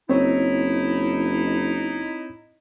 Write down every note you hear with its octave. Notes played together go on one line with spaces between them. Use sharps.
F#1 C4 D#4 E4 C#5